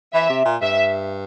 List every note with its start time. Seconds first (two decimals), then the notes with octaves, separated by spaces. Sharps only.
0.14 E3 E5
0.30 C3
0.45 A#2
0.62 G2 E5